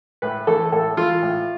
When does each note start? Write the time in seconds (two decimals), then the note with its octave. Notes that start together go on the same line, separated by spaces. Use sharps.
0.22 A2 B4
0.47 E3 A3 A4
0.72 A2 A4
0.97 E3 A3 F4
1.22 A2